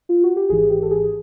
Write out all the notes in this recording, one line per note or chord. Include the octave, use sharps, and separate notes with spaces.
F4
F#4
G4
G#1 G#2 E3 G#4
G4
A4
G#4